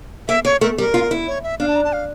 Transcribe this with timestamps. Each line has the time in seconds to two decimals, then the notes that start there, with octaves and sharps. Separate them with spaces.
0.28 A#3 E5
0.45 A#3 C#5
0.61 A3 A#4
0.78 G3 A#4
0.94 F4
1.11 E4
1.27 C#5
1.44 E5
1.60 D4 F5
1.68 A5
1.76 A#5
1.84 A5
1.93 F5